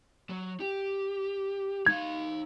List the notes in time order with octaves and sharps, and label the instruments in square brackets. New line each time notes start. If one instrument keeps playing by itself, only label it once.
[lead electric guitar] F#3
G4
[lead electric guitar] D#4 F5 [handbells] G#6